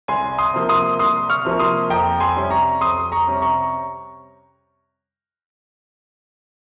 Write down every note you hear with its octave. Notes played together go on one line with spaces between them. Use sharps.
C2 G#5 C6
C6 D#6
C3 F3 A#3
C6 D#6
C2 C6 D#6
C#6 F6
C3 F3 A#3
C6 D#6
F2 G5 A#5
G#5 C6
C3 G3 C#4
A#5 C#6
F2 C6 D#6
A#5 C#6
C3 G3 C#4
A#5 C#6